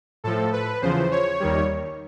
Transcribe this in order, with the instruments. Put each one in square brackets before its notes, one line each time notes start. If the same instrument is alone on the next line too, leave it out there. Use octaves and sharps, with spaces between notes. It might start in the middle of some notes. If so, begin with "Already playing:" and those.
[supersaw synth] A2 F3 A4
B4
E2 C#3 F3 C5
C#5
D#2 D#3 G3